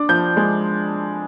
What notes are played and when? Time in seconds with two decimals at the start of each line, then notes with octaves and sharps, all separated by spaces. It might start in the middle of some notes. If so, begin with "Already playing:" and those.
Already playing: D4 D6
0.09 F3 G6
0.37 G#3